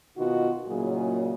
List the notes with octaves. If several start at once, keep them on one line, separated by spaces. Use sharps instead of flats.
B2 D#3 D#4 F4 F#4
A#2 C#3 F#3 D#4 E4 G#4